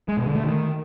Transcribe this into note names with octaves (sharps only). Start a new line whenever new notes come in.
G#3
B2
D3
A3
D#3